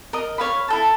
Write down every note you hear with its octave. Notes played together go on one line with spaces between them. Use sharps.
A#4 D#5
C#5 F5 B5
E4 A4 A5